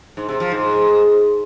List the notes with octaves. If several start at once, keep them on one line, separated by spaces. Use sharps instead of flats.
G#2
C3
F3
G#2